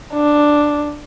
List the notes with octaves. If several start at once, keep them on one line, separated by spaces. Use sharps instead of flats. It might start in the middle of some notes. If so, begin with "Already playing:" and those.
D4